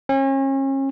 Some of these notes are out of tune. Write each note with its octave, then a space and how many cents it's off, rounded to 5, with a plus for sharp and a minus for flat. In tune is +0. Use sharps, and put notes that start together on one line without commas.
C#4 -35